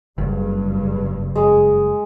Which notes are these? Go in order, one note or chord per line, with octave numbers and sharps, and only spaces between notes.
F#1 G2 C#3
G#3